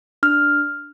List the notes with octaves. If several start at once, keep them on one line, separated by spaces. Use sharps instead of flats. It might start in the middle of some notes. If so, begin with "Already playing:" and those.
D4 F6